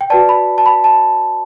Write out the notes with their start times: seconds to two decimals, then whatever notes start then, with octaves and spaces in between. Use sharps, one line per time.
0.01 G5
0.10 F#4 B4 D5 A5
0.29 B5
0.58 A5
0.66 B5
0.84 A5